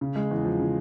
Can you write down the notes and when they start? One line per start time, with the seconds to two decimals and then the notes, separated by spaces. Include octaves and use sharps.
0.01 C#3
0.16 G#3
0.31 E2
0.44 F3
0.60 C#3